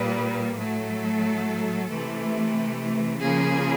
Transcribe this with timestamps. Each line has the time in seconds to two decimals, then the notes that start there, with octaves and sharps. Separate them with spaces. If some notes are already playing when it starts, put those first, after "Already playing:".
Already playing: A#2 G3 A#3 B4
0.54 A2 F#3 A3 A4
1.88 C3 E3 A3
3.20 C#3 F3 A#3 G#4